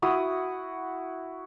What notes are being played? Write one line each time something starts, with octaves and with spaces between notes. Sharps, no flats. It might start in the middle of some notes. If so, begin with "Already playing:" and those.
E4 F#4 D#6